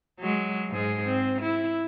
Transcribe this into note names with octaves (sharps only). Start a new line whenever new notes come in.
F#3 G#3
G#2 G#3 G#4
C4
E4